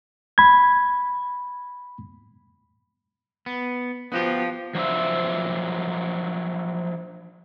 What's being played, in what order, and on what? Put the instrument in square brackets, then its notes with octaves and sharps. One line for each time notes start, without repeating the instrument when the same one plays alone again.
[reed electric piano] B5 G#6
[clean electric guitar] B3
[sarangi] F3 [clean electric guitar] B3 F#4 G4
[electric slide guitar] F3 F#3 D4 C5 E5